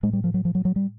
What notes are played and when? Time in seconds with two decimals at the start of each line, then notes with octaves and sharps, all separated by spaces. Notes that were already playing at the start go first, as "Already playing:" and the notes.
0.03 A2 G#3
0.13 G3
0.24 F3
0.34 F#3
0.45 F3
0.55 F#3
0.65 F#3
0.76 G3